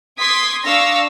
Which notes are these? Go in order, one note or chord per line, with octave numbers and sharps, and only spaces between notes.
C6 D6 D#6 G#6 B6
D4 F5 C#6 E6 A#6